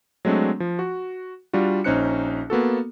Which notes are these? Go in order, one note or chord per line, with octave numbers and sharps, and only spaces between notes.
F#3 G#3 A3 C4 D4
F3
F#4
G3 D4 F4 F#4
A#1 C#4 D#4 C5 F#6 C#7
A#3 B3 F#4 A4